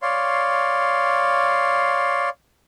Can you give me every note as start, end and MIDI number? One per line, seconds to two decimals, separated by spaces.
0.02 2.29 73
0.02 2.29 74
0.02 2.29 77
0.02 2.29 84